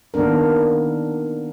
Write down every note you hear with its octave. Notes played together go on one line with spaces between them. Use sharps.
D#3 A#3 B3 D4 A#4